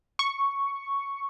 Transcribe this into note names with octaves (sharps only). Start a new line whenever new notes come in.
C#6